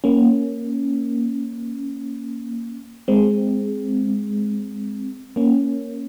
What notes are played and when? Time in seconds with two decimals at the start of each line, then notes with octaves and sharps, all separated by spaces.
0.04 A#3 C#4
3.08 G#3 C4
5.36 A#3 C#4